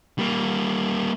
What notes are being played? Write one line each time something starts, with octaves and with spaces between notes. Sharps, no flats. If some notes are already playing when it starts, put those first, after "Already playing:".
G3 A#3